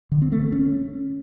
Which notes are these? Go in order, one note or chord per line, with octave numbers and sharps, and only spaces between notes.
D3
C4
A3
C4
C#4